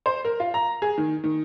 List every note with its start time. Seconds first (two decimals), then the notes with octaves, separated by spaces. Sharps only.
0.06 C5
0.25 A#4
0.40 F4
0.54 A#5
0.82 G#4
0.98 D#3
1.24 D#3